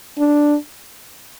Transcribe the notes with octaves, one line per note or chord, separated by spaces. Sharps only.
D4